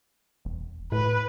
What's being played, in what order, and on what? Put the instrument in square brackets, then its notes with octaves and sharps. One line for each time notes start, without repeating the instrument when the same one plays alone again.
[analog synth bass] E1
[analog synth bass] A2 [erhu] B4